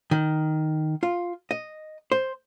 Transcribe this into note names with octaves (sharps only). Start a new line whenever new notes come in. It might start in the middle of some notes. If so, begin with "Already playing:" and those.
D#3
F4
D#5
C5